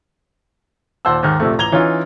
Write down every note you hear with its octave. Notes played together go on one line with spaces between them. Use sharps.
D#2 A#2 C5 F#5 A5 E6
D#2 G#2 D#3 F6
A#1 C3 A3
A1 A#5 G#6 F7 G7
E3 C#4 D#4 F4